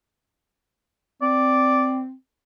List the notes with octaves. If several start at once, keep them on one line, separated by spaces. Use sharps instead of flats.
C4 D5